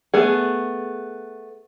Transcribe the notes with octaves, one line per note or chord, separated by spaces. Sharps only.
A3 B3 G#4